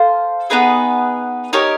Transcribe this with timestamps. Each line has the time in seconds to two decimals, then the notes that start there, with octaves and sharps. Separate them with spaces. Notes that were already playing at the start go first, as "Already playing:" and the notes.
Already playing: F4 A4 C5 F5
0.50 B3 D#4 G#4 B4
1.53 D#4 G4 A#4 C#5